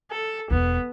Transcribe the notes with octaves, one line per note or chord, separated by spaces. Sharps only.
A4
E1 E2 B3